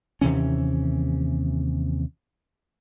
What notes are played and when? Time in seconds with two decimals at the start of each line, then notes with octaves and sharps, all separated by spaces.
0.21 D#2 C3 E3 C#4